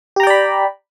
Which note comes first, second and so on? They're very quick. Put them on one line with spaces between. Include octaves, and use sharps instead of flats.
G4 A#5 G5 D5 B5